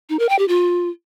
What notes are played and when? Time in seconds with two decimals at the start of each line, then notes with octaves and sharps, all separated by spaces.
0.10 D#4
0.19 A#4
0.29 G5
0.39 G4
0.48 F4